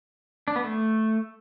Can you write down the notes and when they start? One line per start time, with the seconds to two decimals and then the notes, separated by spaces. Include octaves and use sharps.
0.48 D4
0.56 B3
0.64 A3